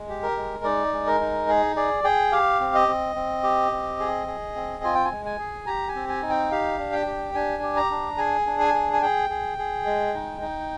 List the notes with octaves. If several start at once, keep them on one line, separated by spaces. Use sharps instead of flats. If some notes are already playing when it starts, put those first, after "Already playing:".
Already playing: G#3
G4
A#4
G#3
D#4 D5
G#3
A#4
D#4
G#4
G#4 D5
G#4 G5
G4 F5
C4
D#5
C4
C4
G4
C4
G#4
G#4
C4
F4 G#5
G5
G#5
G#3
G#5
G#4
G4 A#5
G#5
C4
G#5
D#4
G5
G4 F5
D4
G5
G4
D4 G#5
G4
A#5
D4
G#4 G#5
D4
G#5
G#4
G#5
G#4 G5
G#4
G#4
G#3
D#4
D#4